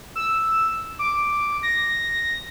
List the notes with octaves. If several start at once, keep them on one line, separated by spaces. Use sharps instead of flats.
E6
D6
A#6